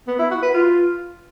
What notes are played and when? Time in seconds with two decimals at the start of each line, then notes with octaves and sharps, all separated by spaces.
0.07 B3
0.19 E4
0.31 F#4
0.42 B4
0.54 F4